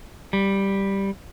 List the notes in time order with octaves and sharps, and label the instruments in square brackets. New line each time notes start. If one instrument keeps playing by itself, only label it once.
[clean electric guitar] G3